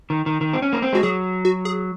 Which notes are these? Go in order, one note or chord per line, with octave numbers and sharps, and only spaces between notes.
D#3
D#3
D#3
C4
C#4
A#3
C4
G#3 F#4
F#3 G#4
F#4
G#4